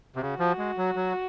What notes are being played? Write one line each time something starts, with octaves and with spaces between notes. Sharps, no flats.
C3
C#3 F#4
F3
G#3
F#3
F#3